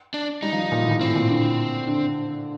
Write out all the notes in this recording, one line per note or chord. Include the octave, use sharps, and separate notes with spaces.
D4
G3 D#4
F3
D#3
A#2
A2
A#2
A2 C4
A#2
D3
D3